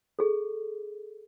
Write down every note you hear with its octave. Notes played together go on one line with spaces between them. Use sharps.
G#4 A4